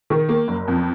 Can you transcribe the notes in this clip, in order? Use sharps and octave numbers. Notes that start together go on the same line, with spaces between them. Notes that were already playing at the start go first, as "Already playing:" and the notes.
D#3
A#3
F#1
F2